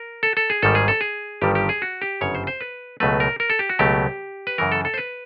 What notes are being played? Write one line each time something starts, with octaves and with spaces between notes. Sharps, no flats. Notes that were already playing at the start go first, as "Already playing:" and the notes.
Already playing: A#4
A4
A4
G#4
G#1 G#2 D#3 G3 A4
G#4
A4
G#4
G1 G2 D#3 G3 G4
G4
G#4
F#4
G4
G1 F#2 C#3 C#5
C5
C5
B4
C#2 B2 F#3 A3 B4
A#4
A#4
A4
G4
F#4
C#2 B2 F#3 A3 G4
B4
F#2 C#3 E3 A#4
A4
A4
C5
B4